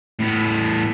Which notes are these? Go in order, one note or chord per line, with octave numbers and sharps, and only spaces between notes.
A2 B3